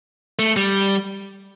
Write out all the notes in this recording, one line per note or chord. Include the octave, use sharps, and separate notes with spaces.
A3
G3